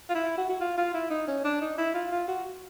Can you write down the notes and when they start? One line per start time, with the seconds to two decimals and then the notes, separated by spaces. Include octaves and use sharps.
0.10 F4
0.15 E4
0.38 F#4
0.50 F#4
0.61 F4
0.78 F4
0.94 E4
1.10 D#4
1.28 C#4
1.44 D4
1.61 D#4
1.78 E4
1.95 F4
2.11 F4
2.28 F#4